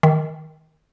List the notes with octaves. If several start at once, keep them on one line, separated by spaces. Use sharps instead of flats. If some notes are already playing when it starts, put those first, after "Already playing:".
D#3